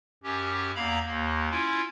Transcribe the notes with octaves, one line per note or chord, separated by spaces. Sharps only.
F#2 C#4 G4
E2 A#3 F5 A#5 B5
D#2 A#3
C#4 E4 F4